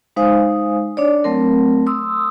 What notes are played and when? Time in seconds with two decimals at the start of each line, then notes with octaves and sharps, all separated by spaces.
0.16 G#3 D#4 C5 F5 G#5 D#6
0.97 D4 C#5 D5
1.24 F#3 A3 C4 A#4
1.87 C6 D#6 E6